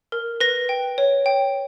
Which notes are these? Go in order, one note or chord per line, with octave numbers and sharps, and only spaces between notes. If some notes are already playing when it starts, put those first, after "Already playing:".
A#4
B4 A#6
G5
C#5
G5